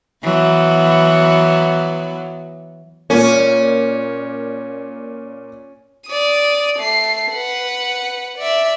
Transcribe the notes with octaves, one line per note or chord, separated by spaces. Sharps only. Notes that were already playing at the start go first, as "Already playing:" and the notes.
E3 F#3 B3
A#2 A#3 C#4
D5 D#6
A3 C7
B4 F#5
D5 E5